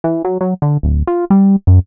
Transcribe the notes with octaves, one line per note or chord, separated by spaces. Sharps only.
E3
F#3
F#3
D3
D1
F4
G3
F#2